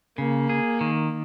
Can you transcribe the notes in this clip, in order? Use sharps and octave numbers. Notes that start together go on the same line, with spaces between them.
C#3 A#3
G#4
D#3